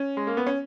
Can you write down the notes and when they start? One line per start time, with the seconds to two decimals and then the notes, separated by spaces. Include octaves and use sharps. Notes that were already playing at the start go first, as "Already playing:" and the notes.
Already playing: C#4
0.17 G#3
0.27 A#3
0.37 B3
0.47 C#4